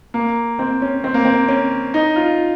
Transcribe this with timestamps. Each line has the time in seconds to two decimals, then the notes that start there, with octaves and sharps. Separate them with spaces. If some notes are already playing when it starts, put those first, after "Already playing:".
0.14 A#3
0.59 C4
0.82 C#4
1.04 C4
1.14 A#3
1.25 C4
1.48 C#4
1.94 D#4
2.16 F4